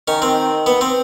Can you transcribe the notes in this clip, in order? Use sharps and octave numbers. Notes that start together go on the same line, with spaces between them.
D#3 C#4
C4
B3
C4